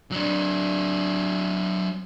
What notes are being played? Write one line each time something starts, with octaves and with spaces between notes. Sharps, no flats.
F#3 D4